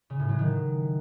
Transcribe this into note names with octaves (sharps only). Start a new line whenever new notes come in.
C#3
A2
F#3
D#3